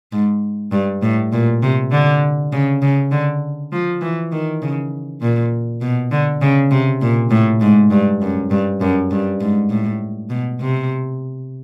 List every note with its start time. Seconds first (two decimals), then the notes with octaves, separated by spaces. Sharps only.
0.12 G#2
0.72 G2
1.02 A2
1.33 A#2
1.62 C3
1.92 D3
2.53 C#3
2.82 C#3
3.12 D3
3.72 F3
4.01 E3
4.32 D#3
4.62 C#3
5.22 A#2
5.82 B2
6.12 D3
6.42 C#3
6.71 C3
7.01 A#2
7.31 A2
7.61 G#2
7.91 G2
8.22 F#2
8.51 G2
8.81 F#2
9.11 G2
9.41 G#2
9.70 A2
10.30 B2
10.61 C3